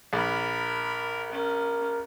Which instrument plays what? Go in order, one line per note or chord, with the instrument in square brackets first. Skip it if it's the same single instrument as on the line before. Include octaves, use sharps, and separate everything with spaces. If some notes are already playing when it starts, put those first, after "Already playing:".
[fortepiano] A#1 [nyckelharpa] A#4 B5
[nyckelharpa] C#4 [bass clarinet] A#4